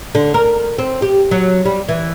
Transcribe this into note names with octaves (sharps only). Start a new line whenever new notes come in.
D3
A#4
C4
G4
F#3
G3
E3